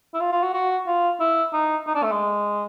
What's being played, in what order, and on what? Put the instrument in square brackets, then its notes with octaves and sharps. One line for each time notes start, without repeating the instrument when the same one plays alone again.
[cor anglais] E4
F4
F4
F#4
F#4
F4
E4
D#4
D#4
D4
A3
G#3